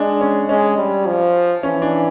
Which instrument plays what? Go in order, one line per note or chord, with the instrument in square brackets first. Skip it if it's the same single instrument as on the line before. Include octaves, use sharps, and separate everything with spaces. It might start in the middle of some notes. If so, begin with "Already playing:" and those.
Already playing: [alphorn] G#3 [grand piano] D4
[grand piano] C#4
[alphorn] G#3 [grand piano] C#4
[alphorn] G3
F3
[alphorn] E3 [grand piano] C#4
[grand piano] D4